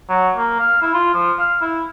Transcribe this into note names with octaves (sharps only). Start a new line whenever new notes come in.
F#3
A#3
F5
E4
F4
F3
F5
E4